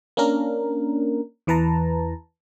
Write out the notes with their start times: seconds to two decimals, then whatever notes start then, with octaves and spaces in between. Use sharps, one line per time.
0.17 A#3 C#4 D4 A#4
1.47 E2 E3 B4 A5 A#5